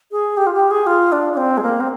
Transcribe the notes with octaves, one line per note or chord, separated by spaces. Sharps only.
G#4
G4
F4
G4
G#4
F4
D4
D4
C4
G#3
A#3
C4